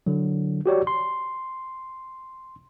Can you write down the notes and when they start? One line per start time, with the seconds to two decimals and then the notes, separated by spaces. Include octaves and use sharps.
0.06 D3 F#3
0.66 F#4 G4 C#5 D5
0.87 C6